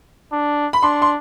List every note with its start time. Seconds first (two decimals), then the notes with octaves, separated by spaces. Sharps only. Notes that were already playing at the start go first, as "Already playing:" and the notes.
0.32 D4
0.73 B5
0.83 D4 C6
1.02 C6